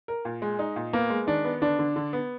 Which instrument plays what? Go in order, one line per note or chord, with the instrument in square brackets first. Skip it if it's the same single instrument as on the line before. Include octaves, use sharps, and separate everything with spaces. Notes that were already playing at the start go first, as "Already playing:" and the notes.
[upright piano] A#4
A#2
G#3
D#4
A#2
[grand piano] A#3 [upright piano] B3
[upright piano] G#3
[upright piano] D#3 [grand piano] D4
[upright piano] B3
[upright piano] D3 [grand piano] D4
[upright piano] D3
D3
B3